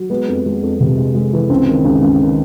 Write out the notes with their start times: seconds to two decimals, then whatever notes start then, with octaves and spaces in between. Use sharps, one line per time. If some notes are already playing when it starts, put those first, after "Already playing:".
Already playing: F#3
0.10 G#3 B3
0.28 F2
0.46 G#3
0.63 F2
0.80 C3
0.98 G#3
1.15 G#3
1.33 E3
1.50 C#2 C4
1.67 D#3
1.85 C#2
2.02 C#2
2.20 D#3